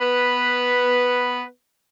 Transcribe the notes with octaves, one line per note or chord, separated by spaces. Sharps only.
B3 B4